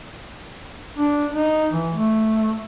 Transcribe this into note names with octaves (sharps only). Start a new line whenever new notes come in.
D4
D#4
E3
A3